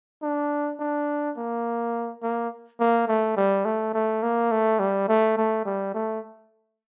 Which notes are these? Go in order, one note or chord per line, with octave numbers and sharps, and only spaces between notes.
D4
D4
A#3
A#3
A#3
A3
G3
A3
A3
A#3
A3
G3
A3
A3
G3
A3